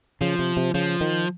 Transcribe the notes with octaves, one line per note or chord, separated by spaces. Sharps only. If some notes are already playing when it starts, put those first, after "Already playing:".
C#3 F3
C3
C3
C#3 F3
D#3